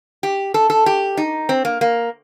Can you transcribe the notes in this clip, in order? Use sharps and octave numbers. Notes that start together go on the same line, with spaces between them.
G4
A4
A4
G4
D#4
C4
A#3
A#3